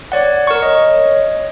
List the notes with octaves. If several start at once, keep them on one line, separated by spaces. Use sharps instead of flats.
C#5 D5 F#5
A#4 C#6
C#5 D#5